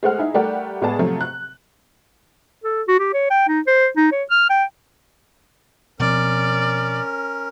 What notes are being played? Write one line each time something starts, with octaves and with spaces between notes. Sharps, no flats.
G#3 A3 C5 F#5 F6
D#4 E4 G#4
G3 A3 G4 A#4 D5 F#5
A2 G#3 B3 G#4 D5 A5
C3 F3 F#3 A3
F#6
A4
F#4
G4
C#5
G5
D#4
C5
D#4
C#5
F6
G5
B2 F3 C4 C#4 A#4 D5